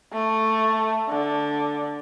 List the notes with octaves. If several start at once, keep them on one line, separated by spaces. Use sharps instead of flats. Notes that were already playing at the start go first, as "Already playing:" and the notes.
A3
D3